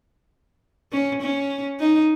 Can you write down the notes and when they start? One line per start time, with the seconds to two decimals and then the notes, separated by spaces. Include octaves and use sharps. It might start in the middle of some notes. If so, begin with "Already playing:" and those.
0.92 C#4
1.22 C#4
1.80 D#4